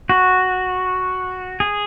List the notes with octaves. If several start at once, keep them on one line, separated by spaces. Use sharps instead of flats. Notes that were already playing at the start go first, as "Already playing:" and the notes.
F#4
G#4